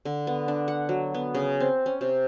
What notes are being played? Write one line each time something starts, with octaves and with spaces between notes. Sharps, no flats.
D3
B3
D4
F#5
F#3
B3
C#3
C4
C#4
C3